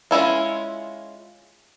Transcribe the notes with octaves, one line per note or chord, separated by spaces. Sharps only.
G#3 C#4 E4 F4